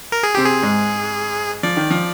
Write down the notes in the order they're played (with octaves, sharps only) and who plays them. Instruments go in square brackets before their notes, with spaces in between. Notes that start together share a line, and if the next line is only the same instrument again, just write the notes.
[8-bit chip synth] A#4
G#4
[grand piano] C3 C4 [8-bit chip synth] G4
[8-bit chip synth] G#4
[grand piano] G#2 G#3
[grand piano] F3 [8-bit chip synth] D5
[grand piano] D#3
F3